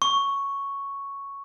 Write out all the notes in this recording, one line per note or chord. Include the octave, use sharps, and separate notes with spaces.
C#6